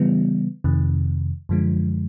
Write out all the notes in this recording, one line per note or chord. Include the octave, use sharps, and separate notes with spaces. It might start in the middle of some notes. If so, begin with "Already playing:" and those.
Already playing: C#3 E3 G3 B3
F2 C3 D#3
F#2 D3 F3 G#3